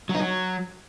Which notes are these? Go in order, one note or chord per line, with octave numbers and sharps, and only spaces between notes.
F#3
D#4
F#3